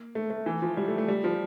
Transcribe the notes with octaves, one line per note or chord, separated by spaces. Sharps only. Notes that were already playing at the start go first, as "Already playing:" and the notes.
Already playing: A#3
A3
A3
E3
F3
G3
A3
A3
G3
F3